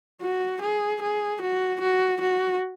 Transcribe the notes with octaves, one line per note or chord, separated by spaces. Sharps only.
F#4
G#4
G#4
F#4
F#4
F#4